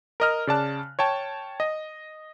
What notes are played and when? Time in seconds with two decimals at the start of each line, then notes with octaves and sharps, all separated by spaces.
0.20 A#4 D#5 F6
0.47 C#3 D5 A5 F#6
0.99 C#5 G5 A5
1.60 D#5